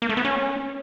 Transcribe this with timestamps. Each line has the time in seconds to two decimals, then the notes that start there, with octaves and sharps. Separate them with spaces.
0.02 A#3
0.09 A3
0.17 B3
0.25 C#4